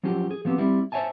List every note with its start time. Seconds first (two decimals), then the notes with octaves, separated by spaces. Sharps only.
0.03 F3 F#3 C#4 F4 G4
0.31 G#4
0.45 F3 B3 C4 G4
0.58 G3 C4 E4
0.92 C5 C#5 D#5 E5 G#5 A5